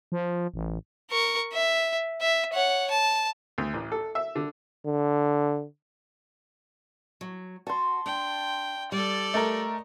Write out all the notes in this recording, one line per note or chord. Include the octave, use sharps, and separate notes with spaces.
F3
A1
A#4 C#6
E5
E5
C#5 F#5
A5
D2
A1
A4
E5
D3
D3
F#3
F#4 A5 C6
D4 G5
G3 A4 D5
A3 A#4 D#5 A#5